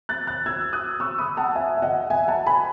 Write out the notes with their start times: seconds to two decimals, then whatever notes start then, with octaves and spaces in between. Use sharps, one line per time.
0.09 F#6 A6
0.27 F#6 A6
0.46 E6 G#6
0.73 D#6 F#6
1.00 C#6 E6
1.19 B5 D#6
1.37 F#5 A5
1.55 E5 G#5
1.77 E5
1.82 D#5 F#5
2.10 E5 G#5
2.28 F#5 A5
2.47 G#5 B5